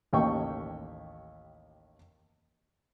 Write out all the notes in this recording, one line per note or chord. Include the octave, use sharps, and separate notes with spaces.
A1 D#2 G5 C#6